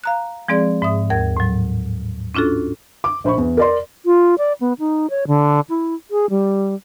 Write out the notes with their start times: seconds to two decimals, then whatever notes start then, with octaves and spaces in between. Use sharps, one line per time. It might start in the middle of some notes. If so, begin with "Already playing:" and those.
0.04 F5 A#5 F#6
0.48 F3 G#3 C4 G#4 D5
0.82 G#2 E5 D#6
1.10 D#2 A#4 G#6
1.37 A2 F#3
2.35 C#4 D4 F4 F#4 A4
3.04 D6
3.24 A#1 C5 B5 C#6
3.38 E2
3.57 A#4 D5 C6
4.05 F4
4.38 D5
4.61 B3
4.79 D#4
5.10 C#5
5.27 D3
5.69 E4
6.11 G#4
6.30 G3